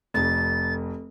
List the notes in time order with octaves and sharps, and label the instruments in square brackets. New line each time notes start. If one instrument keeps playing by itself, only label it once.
[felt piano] F1 F2 [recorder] A6